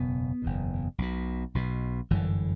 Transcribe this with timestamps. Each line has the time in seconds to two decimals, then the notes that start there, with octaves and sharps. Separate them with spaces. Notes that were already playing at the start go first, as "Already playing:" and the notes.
Already playing: F#1 E2 B2 B3
0.42 F#1 E2 B2
0.98 B1 B2
1.55 B1 B2
2.10 G1 F#2 D3 E3